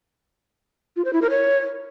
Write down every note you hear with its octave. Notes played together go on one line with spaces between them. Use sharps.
F4
C5
E4
A#4
C#5